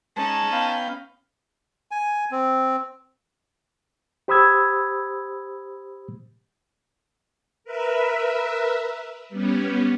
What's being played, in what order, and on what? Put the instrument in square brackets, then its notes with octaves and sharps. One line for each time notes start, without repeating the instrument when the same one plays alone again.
[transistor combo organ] G#3 [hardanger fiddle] C#4 D#4 [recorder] A5
[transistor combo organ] B3 G5 [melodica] F5
[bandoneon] G#5
C4
[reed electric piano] G4 C5 B5 D#6 E6 G#6
[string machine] A#4 B4 E5
G3 B3 C#4